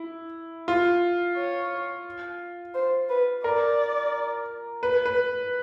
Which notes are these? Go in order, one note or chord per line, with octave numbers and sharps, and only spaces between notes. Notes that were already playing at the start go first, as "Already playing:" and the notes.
Already playing: E4
F4
C#5
C5
B4
A#4 D5
B4
B4